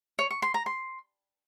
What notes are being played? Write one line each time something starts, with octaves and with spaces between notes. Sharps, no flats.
C#5
C#6
C6
A#5
C6